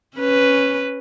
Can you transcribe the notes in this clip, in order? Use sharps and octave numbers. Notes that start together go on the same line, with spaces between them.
C#4 B4